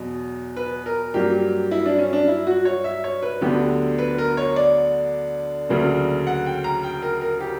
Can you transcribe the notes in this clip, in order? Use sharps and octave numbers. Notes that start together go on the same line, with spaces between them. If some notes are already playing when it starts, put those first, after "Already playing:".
Already playing: E2 B2 F#3
B4
A#4
G2 F#3 A#3 G4
E4
D4
C#4
D4
E4
F#4
C#5
E5
C#5
B4
D2 D3 F#3 B3 G4
B4
A#4
C#5
D5
D2 C#3 F#3 A#3
F#5
G5
A#5
G5
A#4
A#4
G4